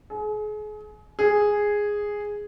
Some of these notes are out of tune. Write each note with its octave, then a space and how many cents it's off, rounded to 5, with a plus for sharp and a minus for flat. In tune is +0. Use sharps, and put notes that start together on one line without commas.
G#4 +35
G#4 -5